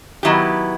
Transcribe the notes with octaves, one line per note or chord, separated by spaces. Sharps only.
D#3 F#3 B3 E4 G4